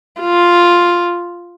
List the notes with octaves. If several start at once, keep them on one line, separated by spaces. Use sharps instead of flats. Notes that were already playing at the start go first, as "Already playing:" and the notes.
F4